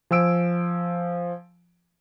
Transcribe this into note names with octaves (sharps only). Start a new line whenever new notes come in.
F3 G#5 E6 D7